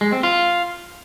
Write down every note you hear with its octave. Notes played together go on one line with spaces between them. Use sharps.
G#3
C4
F4